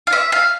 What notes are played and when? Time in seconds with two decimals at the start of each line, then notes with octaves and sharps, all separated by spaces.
0.07 F5
0.13 E5
0.32 F5